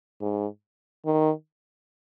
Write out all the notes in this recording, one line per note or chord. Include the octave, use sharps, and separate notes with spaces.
G#2
D#3